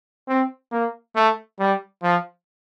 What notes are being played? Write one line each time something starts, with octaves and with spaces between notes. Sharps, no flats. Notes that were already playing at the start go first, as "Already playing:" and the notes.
C4
A#3
A3
G3
F3